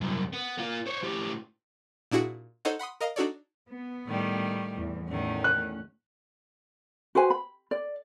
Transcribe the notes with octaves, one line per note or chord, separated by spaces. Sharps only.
C2 F#2
B3
A#3 F4
C5 C#5
A2 G4
A#2 D4 E4 F#4 G#4 F#5
D#4 A4 C5 C#5 D#5 F#5
F#5 B5 C6 D#6
A#4 D#5 F5 A#5
D4 D#4 F#4 A4 C#5 D5
B3
A2 D#3 G3
E2 E3
E2 A2 D#3 C#4
F#6
F#4 B4 C5 G#5
B5
D5